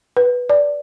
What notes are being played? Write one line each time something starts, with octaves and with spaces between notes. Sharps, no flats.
B4
D5